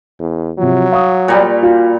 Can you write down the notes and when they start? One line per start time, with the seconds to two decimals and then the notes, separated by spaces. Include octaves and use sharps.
0.20 E2
0.58 C3 F3 F#3
0.92 F5 C#6 D#6
1.28 A#2 G3
1.63 F4 F#4